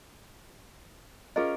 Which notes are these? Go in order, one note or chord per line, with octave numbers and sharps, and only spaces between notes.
C#4 F4 G#4 A#4 D#5